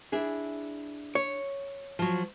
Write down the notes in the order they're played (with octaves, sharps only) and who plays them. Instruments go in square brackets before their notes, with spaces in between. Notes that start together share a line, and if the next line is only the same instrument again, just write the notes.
[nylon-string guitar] D4 E4 G#4
[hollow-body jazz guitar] C#5
[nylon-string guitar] F3 F#3